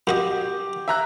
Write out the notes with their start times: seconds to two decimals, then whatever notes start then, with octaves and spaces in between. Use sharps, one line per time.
0.07 F#2 F#4 G4 D#5
0.88 E5 A#5 F#6